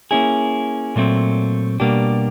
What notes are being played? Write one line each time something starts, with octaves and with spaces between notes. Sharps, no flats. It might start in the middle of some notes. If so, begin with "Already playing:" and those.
A#3 C#4 E4 G#4
A#2 F#3 A3 C4
B2 G3 A#3 D4 G4